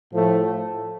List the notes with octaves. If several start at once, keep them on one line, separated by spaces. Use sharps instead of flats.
A2 F3 A3